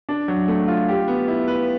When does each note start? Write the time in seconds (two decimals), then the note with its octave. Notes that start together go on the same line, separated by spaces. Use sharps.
0.09 D4
0.28 F#3
0.48 A3
0.68 F4
0.88 G4
1.08 B3
1.28 E4
1.48 B4